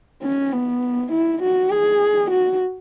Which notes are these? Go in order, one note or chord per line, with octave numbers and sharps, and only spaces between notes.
C#4
B3
E4
F#4
G#4
F#4